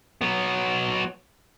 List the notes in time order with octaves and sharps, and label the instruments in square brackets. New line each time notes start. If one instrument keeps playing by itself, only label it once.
[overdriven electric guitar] F#3 B3